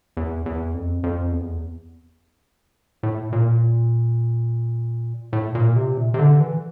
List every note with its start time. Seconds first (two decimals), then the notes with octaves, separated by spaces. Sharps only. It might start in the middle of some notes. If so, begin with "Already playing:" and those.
0.17 E2
0.46 E2
0.74 F2
1.03 F2
1.32 E2
3.03 A2
3.33 A#2
5.33 A2
5.55 A#2
5.76 C3
5.97 A#2
6.14 C3
6.19 D3
6.40 E3